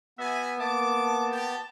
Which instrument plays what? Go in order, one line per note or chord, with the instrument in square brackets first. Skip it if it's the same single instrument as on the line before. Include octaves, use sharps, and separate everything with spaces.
[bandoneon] B3 [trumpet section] F#4 G#5 [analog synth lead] E5
[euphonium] A#3 [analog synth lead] A5 [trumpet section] D6
[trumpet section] G4